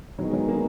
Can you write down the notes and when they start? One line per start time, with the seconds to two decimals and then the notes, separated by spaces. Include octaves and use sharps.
0.18 D#3 F#3 G#3 B3 D#4 G#4
0.33 F#3
0.48 A#3